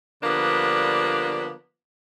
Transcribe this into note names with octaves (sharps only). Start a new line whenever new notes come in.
D3 F3 G3 A#3 B3 D4